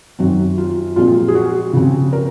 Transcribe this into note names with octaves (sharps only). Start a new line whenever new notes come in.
F#2 D#3 F#3 C4 F#4
F4
A#2 F3 G#3 C4 F4
G#4
F#4
C#3 F3 C4
A#4